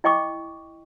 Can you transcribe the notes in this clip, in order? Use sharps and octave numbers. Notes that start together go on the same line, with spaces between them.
E4 D#5 G5 C#6 D6